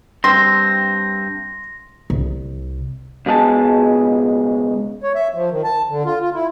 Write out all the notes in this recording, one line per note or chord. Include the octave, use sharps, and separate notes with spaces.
G2 C4 C6 A#6
C2
C#2 B2 G#3 G#4 G#5 A5
C#5
E5
F3
D#3
A5
D3
F4
F4
E4